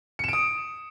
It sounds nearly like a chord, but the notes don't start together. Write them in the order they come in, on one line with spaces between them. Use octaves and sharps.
C#7 E7 D7 D#6